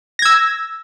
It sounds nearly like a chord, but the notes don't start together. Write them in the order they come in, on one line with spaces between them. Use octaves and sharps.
A#6 G#6 E6